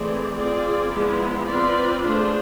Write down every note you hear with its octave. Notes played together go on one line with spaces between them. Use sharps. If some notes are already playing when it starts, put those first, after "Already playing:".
Already playing: E3 A3 C4 G#4 D5
C4 F4 G#4 D5
F3 G#3 B3 E4
C4 F4 B4 D5
A3 D4 F4 G#4 C5